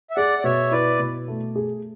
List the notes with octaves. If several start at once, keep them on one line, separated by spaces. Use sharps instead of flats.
E5
G#4 D5 F#5
D5
B2 C#5 E5
E4 B4 D5
B2
A3
G#4